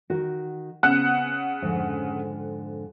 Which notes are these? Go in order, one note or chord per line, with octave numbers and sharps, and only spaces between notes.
D#3 F#4 A#4
C#3 B3 C4 F#5 F#6
F2 G#2 D3